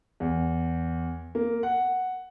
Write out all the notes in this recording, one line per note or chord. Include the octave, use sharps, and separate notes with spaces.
E2
A#3
F#5